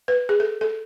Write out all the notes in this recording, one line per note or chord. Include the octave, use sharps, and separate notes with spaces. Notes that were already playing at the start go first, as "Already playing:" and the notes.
B4
G#4
A4
A4